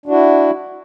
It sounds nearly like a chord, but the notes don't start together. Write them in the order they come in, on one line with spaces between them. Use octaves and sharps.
D4 F#4 E4